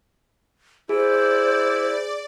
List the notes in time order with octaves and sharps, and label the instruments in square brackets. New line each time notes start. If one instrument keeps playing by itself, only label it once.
[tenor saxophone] E4 [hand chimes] G#4 [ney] C5 [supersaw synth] D5